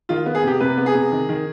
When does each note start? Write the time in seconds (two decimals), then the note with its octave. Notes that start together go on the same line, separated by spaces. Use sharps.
0.09 D#3 F4
0.26 B3
0.35 G#4
0.43 C3 G4
0.60 C3 B4
0.77 B3
0.86 G#4
0.94 C3
1.12 D#3
1.29 D#3